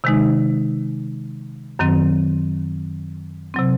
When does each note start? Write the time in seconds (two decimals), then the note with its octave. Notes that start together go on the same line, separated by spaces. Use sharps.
0.04 C3 D#3 G#3 D#4
1.79 F#2 D#3 F#3 C4
3.54 C3 F#3 C4